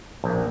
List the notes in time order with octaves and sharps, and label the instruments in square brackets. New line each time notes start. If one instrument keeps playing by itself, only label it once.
[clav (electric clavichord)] A#1